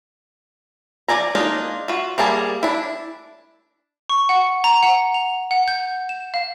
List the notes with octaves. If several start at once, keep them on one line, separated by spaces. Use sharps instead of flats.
F3 G#4 D5 G#5 A#5
G#3 A#3 D4 D#4 F4
F4 F#4
G3 A#3 G#4 A5
D4 E4
C#6
F#5
A#5
F#5
F7
F#5
G6
E7
F5